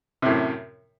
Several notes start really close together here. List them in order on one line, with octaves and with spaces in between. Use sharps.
C3 A2 F#2